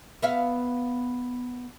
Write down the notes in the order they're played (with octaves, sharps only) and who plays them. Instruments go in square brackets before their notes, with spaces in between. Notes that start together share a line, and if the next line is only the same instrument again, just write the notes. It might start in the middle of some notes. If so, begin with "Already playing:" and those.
[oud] B3 E5 F5